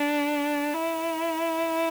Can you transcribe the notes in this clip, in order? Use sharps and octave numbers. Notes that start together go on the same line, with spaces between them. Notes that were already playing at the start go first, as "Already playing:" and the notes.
Already playing: D4
E4